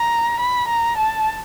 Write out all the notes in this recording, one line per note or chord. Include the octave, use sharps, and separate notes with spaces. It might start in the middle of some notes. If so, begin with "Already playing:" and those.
Already playing: A#5
B5
A#5
A5